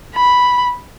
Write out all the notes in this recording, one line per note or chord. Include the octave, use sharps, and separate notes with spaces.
B5